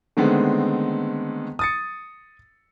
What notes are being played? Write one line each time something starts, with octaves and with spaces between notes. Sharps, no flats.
D3 D#3 G#3 A3 B3 C4
D#6 A6 C#7